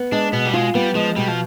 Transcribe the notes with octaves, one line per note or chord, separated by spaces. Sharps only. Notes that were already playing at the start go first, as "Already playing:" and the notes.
Already playing: B3
G#3 D4
B2 B3
G3
G#3 F4
G3 B3
F3 G#3
B2 G3
F3